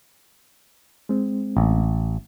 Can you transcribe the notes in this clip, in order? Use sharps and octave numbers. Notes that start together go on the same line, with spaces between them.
G#3 C4
A1